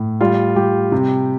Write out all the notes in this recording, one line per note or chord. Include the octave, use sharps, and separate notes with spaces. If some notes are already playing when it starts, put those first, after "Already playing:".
Already playing: A2
G3 F4
G3 G4
C3